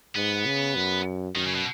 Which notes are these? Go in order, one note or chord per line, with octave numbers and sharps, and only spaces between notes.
G#2 B3
C#3
F#2
F#2 D#3
C#3
B2